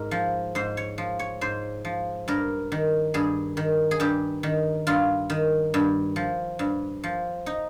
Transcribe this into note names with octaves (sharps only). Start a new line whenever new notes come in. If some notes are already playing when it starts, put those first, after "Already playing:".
Already playing: G#2 A#4
F3
G#2 C5
C#5
F3
C#5
G#2 C5
F3
G2 A#4
D#3
G2 G#4
D#3
G#4
G2 G4
D#3
G2 F4
D#3
G2
F3
G2
F3
D#4